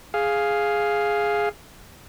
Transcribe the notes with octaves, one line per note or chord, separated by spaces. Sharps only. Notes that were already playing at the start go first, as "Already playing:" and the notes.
G#4 F5